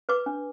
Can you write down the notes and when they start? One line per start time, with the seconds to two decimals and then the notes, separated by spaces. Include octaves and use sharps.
0.09 B4 D6
0.26 D4